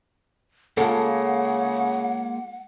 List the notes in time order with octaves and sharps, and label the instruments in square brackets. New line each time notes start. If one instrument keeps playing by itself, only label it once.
[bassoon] C#3 [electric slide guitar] G#3 A#3 [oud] F4 A4 [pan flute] F#5